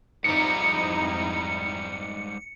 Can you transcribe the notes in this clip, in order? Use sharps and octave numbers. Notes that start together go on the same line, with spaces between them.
F2 G#2 G3 D#4 E4 C#7